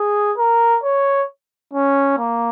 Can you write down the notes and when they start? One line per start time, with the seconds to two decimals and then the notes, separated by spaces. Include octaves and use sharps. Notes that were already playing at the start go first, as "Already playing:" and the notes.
Already playing: G#4
0.38 A#4
0.84 C#5
1.74 C#4
2.19 A#3